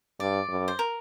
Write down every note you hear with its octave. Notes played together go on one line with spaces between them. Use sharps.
G2 D5
F#2
C5
A#4